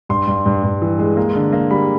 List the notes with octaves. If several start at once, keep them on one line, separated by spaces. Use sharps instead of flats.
G2 C6
G2
G2
G2
E3
G#3
A#3
D3
A#3
G3 B5